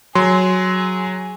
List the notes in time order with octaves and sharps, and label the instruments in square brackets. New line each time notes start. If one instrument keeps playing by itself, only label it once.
[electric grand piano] F#3 [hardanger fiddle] G#4 [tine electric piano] C6